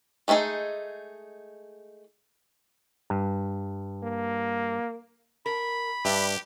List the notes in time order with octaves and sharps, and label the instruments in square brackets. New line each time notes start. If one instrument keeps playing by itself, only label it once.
[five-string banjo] G#3 A3 C#4 D#4 G#4
[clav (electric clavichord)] G2
[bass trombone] A#3
[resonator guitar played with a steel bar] A#4 [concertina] B5
[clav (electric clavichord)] G2 [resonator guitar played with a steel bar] D4 D5 E5 [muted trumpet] G4